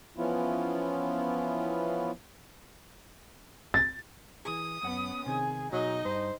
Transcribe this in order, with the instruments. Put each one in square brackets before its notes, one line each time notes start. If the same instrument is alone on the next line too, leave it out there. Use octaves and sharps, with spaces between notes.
[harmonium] E3 F3 B3 C#4 E4 F4
[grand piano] A6
[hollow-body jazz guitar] E3 G#4 [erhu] D#6
[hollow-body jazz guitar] F#2 F#5 [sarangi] B3 [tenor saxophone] C#4
[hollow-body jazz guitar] C3 D#3 [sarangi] G#4
[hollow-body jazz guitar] B2 [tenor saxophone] F#3 [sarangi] D#4 [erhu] D#5
[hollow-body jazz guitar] G2 [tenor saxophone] C5